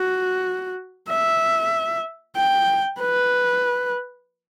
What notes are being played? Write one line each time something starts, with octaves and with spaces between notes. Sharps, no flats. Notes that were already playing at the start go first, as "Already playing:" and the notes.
Already playing: F#4
E5
G5
B4